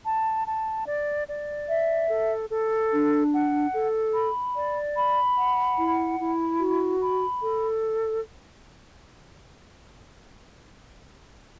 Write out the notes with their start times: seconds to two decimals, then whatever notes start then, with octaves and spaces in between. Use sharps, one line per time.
0.05 A5
0.47 A5
0.87 D5
1.28 D5
1.69 E5
2.10 A4
2.50 A4
2.92 D4
3.33 F#5
3.74 A4
4.14 B5
4.56 D5
4.96 B5
5.37 F#5
5.78 E4
6.19 E4
6.60 F#4
7.01 B5
7.42 A4